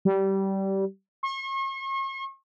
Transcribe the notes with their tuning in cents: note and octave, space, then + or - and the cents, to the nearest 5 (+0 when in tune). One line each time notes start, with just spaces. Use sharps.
G3 -20
C#6 -45